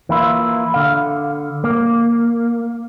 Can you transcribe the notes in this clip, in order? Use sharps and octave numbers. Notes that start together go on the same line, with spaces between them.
E3 A#3 E4 F4
D3 F5
A#3